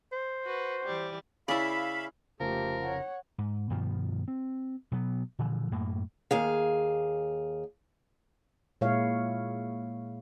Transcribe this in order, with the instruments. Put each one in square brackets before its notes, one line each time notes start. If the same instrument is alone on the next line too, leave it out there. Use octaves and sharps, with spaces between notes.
[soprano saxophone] C5
[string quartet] F#4 B4
E3 G3
[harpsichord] C#3 [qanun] E4 D5 [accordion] E5 F5 B5
[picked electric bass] F1 C#3 [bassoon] F3 [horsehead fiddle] A3 G4 [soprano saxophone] A#4
[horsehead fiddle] C#5 F#5
[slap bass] G#2
G2 B2 D#3 F3
C4
B2 F#3 B3
A#2 D3 E3 F3
F#2 A2 A3 A#3
[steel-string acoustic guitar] D#2 G#4 F5
[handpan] A#2 G#3 E4 C#5 F5